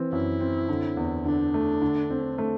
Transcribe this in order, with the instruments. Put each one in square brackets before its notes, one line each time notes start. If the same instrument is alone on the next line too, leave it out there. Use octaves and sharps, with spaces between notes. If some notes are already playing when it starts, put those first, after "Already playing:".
Already playing: [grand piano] E3 C4
[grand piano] F#2 [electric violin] E4
[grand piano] C4
D3
E2
[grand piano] D3 [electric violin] D4
[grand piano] A3
D3
C4
A3